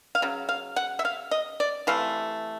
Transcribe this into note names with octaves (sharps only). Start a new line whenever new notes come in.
F5
C#3 F#3
F5
F#5
E5
F5
D#5
D5
C3 E3 A3 F5